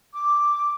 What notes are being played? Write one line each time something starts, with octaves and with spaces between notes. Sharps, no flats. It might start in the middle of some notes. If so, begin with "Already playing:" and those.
D6